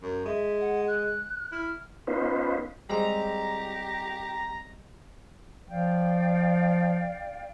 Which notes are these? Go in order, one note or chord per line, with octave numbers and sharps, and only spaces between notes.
F#2
G#3 E5
F#5
F#6
E4 F6
B3 C#4 D#4 F4 B4 C5
G3 G#3 C4 G4 A#5
F3 D5 F5 G5